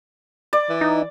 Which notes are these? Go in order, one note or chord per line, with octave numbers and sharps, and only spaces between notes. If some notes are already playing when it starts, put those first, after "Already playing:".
D5
E3
D#4